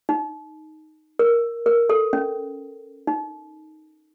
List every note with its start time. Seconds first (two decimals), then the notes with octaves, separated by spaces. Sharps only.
0.09 D#4
1.19 A#4
1.66 A#4
1.90 A4
2.13 C#4
3.07 D#4